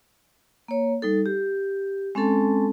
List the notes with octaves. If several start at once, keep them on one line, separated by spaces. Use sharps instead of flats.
A#3 C#5
G3 D#4 A4
G4
G#3 C4 C#4 A4 A5